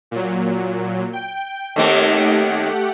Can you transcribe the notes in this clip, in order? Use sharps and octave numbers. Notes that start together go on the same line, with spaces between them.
A#2 F#3
G5
D#2 D#3 A3 C4 G4 F#5